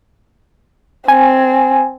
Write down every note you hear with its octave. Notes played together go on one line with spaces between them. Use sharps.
C4 G#5